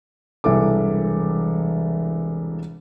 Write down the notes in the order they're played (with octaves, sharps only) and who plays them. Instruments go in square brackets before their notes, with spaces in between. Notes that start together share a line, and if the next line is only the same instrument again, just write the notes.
[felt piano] E1 C2 E3 A4 D6